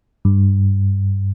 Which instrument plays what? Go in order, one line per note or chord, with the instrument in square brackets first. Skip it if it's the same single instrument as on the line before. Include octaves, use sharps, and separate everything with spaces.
[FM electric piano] G2